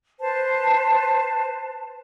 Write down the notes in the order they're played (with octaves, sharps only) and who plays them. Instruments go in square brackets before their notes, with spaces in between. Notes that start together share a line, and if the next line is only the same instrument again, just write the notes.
[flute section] B4 C5 A5